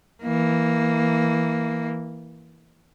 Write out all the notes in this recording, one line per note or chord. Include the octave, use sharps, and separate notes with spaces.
E3 A#3